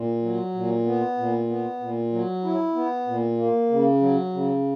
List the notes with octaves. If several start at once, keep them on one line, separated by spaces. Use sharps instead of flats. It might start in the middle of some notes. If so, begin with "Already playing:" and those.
Already playing: A#2
F#3
A#2
B3
A#2
B3
A#2
F#3
E4
B3
A#2
A#3
C#3
F#3
C#3